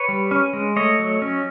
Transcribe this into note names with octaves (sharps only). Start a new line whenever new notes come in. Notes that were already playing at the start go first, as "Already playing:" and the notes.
Already playing: B4 C#5
G3
C#4
G#3
A3 C#5 D#5
F#3
C#4